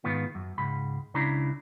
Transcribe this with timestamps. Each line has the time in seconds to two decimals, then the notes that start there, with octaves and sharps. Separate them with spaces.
0.04 G#2 D#3 B3 F4
0.35 F#2
0.58 C#2 G#2 B5
1.14 C#2 C#3 D4 E4 A#5 B5